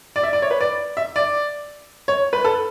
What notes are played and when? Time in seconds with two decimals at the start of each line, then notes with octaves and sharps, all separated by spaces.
0.16 D5
0.23 E5
0.33 D5
0.42 C#5
0.51 B4
0.61 D5
0.97 E5
1.16 D5
2.08 C#5
2.33 B4
2.44 A4